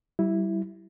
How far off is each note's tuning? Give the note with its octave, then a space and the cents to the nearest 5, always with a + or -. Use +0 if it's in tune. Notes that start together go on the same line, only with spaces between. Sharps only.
G3 -25 E4 +0